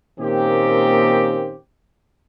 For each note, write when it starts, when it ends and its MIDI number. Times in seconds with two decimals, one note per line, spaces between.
0.20 1.56 46
0.20 1.56 51
0.20 1.56 58
0.20 1.56 60
0.20 1.56 61
0.20 1.56 67